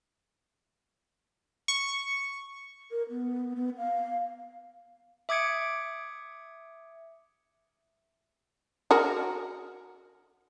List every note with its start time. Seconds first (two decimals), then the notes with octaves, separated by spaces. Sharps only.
1.68 C#6
2.91 A#4
3.10 B3
3.56 B3
3.78 F5
5.29 E5 D6 D#6 G#6 C#7 D7
8.91 F#4 G#4 A#4